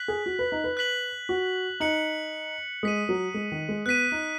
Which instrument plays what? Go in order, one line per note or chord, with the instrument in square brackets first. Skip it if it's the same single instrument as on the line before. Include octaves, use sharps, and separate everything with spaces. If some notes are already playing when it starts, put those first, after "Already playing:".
Already playing: [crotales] F#6 B6 F#7
[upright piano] G#4
F#4
B4
D#4
B4
[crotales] F#6 B6 F#7
[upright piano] F#4
[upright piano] D#4 [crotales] F#6 C#7 F#7
[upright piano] G#3 [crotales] D#6 B6 D#7
[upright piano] F#3
G#3
D#3
G#3
[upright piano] B3 [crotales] F#6 B6 D#7
[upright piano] D#4